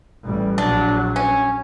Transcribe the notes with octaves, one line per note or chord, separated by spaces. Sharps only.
A1 G3
A#1 F#3 D4
C#4